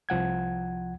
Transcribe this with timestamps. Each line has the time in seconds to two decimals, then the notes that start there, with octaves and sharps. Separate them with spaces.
0.09 C2 F3 F#5 G#6